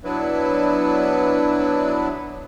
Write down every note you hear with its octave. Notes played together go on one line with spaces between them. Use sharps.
F#3 B3 D4 E4 B4